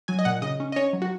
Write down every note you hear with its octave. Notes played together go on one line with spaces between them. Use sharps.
F#3 G#5
D#5
A#2 F#5
C#3 D#5
C#4
D#5
C#4 C#5
F#3
F#4